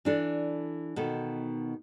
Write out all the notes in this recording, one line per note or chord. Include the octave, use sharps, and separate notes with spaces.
E3 D4 A4
B2 D#3 A4